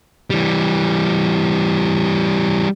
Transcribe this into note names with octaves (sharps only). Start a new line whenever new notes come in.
E3 G3